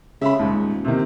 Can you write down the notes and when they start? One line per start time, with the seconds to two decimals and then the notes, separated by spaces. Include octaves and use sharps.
0.21 C#3 E5 B5
0.39 D#1 D#2 G#2
0.85 C3 D#3